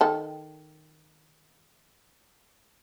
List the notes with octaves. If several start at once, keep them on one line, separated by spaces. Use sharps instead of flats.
D#3 A4